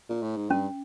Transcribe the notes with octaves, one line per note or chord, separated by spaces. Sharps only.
A#2
A2
G#2
G2 C#4